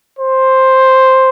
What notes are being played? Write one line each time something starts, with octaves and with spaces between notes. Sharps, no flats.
C5